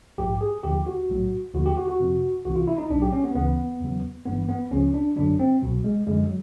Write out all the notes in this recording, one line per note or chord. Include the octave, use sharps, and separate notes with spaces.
A#1 G#2 F3 G4
G#4
D#2 D3 F3 G4
F#4
B1 A2 F#3
D#2 D3 F3 F#4
G4
F#4
F#4
F2 C3 F3
C2 C3 E3 F#4
F4
E4
D#4
B1 A2 F#3 D4
G4
C#4
B3
D2 C#3 E3 B3
E2 C#3 F#3
G#1 G2 E3 B3
B3
C#2 C#3 F3 C#4
D4
G#1 F#2 D3 F#3 D4
C4
C2 B2 F#3
G#3
F#2 D3 F3 G#3
F#3